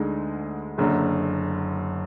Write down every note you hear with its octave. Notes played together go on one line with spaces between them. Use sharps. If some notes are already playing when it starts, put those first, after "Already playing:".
Already playing: D2 D3 G#3 D#4
F#1 F#2 D3